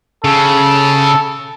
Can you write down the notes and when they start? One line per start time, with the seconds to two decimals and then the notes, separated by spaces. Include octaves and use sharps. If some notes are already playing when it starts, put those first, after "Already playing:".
0.24 C#3 A4